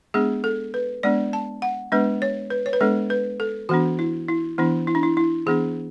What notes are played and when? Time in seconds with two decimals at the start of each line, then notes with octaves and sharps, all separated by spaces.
0.14 G#3 B3 D4 G#4
0.44 A4
0.74 B4
1.03 G#3 B3 D4 D5
1.33 A5
1.62 F#5
1.92 G#3 B3 D4 B4
2.22 C#5
2.50 B4
2.66 C#5
2.73 B4
2.81 G#3 B3 D4 A4
3.10 B4
3.40 A4
3.69 E3 B3 D4 F#4
3.99 E4
4.28 E4
4.58 E3 B3 D4 E4
4.87 E4
4.95 D4
5.03 E4
5.17 E4
5.46 E3 B3 D4 G#4